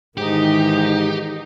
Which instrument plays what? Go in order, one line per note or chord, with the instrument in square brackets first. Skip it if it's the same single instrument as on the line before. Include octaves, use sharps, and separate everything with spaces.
[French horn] G#2 [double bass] D#3 E3 [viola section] D#4 [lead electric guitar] G4